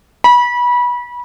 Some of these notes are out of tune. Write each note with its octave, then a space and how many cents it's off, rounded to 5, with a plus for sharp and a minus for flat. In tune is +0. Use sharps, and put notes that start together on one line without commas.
B5 -25